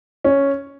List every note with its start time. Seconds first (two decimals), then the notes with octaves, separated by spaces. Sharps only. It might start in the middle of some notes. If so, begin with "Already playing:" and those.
0.24 C#4